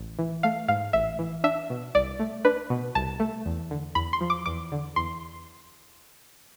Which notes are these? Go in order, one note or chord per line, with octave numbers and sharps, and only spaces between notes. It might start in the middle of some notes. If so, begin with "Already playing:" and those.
Already playing: A1
E3
A3 F5
G#2 F5
A1 E5
E3
D4 E5
B2
C2 D5
A3
D4 B4
B2
C2 A5
A3
E2
D3
E2 B5
C6
F3
D6
E2 D6
D3
E2 C6